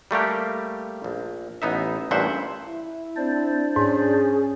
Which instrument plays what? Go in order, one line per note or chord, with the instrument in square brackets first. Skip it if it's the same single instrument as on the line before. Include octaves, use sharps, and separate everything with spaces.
[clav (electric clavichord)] G3 A3 A#3 G4
A#1
A1 B3 D#4 E5
A1 G2 A#2 C5 E5 F#5
[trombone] E4
[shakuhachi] C4 [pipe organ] D4 C5 D5
[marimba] G#2 [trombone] C#4 [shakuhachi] G#4